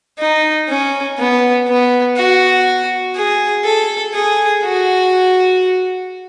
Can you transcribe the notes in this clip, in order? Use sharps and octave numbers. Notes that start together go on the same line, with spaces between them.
D#4
C#4
B3
B3
F#4
G#4
A4
G#4
F#4